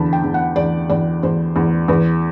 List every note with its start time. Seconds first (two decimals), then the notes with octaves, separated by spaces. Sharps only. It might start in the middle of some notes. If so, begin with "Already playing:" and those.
Already playing: E2 D3 A5 B5
0.13 G5
0.24 E2
0.34 F#5
0.56 E2 D5
0.89 E2 D5
1.23 E2 C5
1.56 E2
1.88 E2 B4